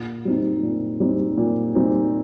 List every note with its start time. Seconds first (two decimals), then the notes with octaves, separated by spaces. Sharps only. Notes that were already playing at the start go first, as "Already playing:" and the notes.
Already playing: A#2
0.25 G3 C4 D#4
0.63 A#2
1.00 G3 C4 D#4
1.38 A#2
1.75 G3 C4 D#4